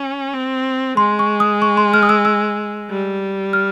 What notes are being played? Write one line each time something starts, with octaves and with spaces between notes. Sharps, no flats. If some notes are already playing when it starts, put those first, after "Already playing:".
Already playing: C#4
C4
G#3 C6
C#6
D#6
C#6
C6
F6
D#6
E6
E6
G3
F6